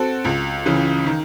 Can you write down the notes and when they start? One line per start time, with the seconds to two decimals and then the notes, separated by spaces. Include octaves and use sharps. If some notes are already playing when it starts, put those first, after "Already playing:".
Already playing: C4 F#4 A4
0.24 C#2
0.66 C#3 E3
1.06 D#3